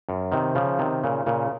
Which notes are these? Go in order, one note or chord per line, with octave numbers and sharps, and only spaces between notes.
F#2
C3 D#3
C#3 F3
C3 D#3
A#2 C#3
A#2 C#3